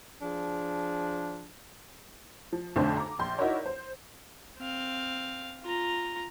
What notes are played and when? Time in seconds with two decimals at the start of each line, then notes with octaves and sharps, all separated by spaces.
0.21 F3 D4 G#4
2.53 F3
2.76 B1 F2 D3 A3 D4 C5
2.97 A#5 D6
3.19 A#1 C6 G6
3.38 D#4 E4 F#4 A#4 C#5 D5
3.66 C5
4.58 C4 F5
5.63 F4 A#5